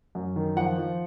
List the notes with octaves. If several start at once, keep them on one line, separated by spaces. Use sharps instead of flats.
F#2
D#3
F3 F#5
F3